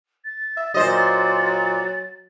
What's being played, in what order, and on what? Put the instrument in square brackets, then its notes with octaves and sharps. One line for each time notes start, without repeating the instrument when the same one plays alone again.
[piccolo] A6
[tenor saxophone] E5
[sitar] A#2 C5 D#5 [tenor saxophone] F#3